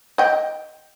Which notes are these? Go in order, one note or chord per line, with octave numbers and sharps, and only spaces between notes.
D#5 G5